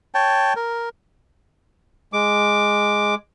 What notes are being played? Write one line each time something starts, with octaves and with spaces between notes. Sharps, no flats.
C#5 G5 A5
A#4
G#3 D6